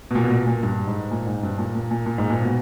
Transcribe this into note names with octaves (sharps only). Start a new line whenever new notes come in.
B2
A#2
B2
A#2
A#2
G2
G#2
A#2
G#2
G2
A#2
A#2
A#2
A#2
G#2
A#2
B2